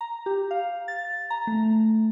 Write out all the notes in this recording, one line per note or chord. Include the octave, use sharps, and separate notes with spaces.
A#5
G4
F5
A6
A#5
A3